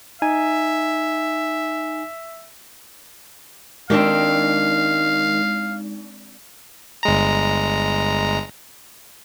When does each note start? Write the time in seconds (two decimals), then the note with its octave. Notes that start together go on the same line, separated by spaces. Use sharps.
0.22 D#4 E5 G#5
3.90 D#3 G#3 C4 D4 D#4 G4 F5
7.03 G1 G#3 A#5